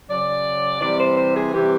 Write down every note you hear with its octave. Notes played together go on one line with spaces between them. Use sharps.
C#3 F#3 D5
C3 E3 G3 D5
C5
C5
G#4
C3 E3 G3 G4